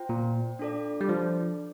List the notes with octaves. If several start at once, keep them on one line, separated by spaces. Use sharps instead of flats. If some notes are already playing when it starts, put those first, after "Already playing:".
Already playing: F4 C5 G5
A#2
D4 F4 A4 D5
G3
F3